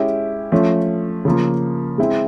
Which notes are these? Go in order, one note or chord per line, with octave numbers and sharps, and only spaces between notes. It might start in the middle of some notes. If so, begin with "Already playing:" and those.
Already playing: G#3 C#4 E4 G4
F3 A3 C#4
C#3 F3 A#3
G#3 C4 E4